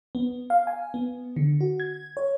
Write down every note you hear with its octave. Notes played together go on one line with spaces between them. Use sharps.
B3
F5
G#5
B3
D3
F#4
G#6
C#5